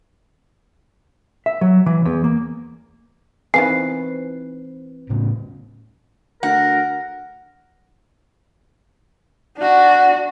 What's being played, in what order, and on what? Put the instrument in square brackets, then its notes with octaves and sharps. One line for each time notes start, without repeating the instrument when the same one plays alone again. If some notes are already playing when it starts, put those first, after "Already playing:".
[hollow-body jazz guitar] E5
F#3
E3
E2
A#3
[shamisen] D#3 F5 G#5 [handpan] E3 C4 B4 [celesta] C7
[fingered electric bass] A2 C#3
[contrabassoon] D2 [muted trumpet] A#4 [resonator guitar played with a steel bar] F#5
[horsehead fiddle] D4 F#4